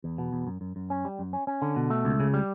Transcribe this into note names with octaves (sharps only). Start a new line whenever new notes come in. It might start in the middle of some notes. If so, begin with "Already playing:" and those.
E2
B2
E2
F#2
F#2
F#2
C#4
G3
F#2
C#4
C#4
D3
B2
A3
C#2
C#3
G3